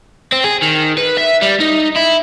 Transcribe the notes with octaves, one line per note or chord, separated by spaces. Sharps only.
C4
G#4
D#3
B4
E5
G3
D#4
E4